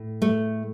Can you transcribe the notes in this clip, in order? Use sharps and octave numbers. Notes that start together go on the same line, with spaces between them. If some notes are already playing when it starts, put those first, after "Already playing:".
Already playing: A2
A3